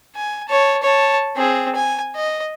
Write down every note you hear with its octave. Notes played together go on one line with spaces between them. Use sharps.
G#5
C#5 A5
C#5 A5
C4 G#4
G#5
D#5